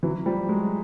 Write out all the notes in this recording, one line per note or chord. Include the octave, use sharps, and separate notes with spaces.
E3 F#3
F3 G3
F#3 G#3